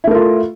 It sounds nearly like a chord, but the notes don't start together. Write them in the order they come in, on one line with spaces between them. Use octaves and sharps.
E4 A3 A#4 F4